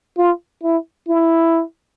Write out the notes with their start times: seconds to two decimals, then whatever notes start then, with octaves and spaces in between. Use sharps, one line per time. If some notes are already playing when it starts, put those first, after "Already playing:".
0.17 F4
0.63 E4
1.08 E4